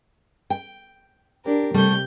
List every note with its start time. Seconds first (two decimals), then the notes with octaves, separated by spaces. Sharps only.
0.50 G5
1.44 D4 G4 A#4
1.74 C3 G3 A3 G4 G6